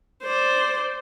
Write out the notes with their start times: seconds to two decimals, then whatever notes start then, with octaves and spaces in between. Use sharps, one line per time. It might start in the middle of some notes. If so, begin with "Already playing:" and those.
0.23 C5 D5